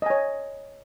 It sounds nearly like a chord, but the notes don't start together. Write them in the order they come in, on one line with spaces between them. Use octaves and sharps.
D#5 G#5 C#5